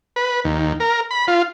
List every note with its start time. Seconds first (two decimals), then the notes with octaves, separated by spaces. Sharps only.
0.16 B4
0.44 D#2
0.80 A#4
1.11 B5
1.28 F4